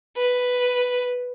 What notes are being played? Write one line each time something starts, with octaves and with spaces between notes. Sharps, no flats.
B4